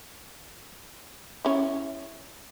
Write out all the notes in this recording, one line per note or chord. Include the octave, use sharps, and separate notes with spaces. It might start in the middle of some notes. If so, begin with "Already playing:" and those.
C#4 E4